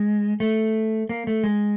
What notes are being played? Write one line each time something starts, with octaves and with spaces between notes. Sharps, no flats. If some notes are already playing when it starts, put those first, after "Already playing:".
Already playing: G#3
A3
A#3
A3
G#3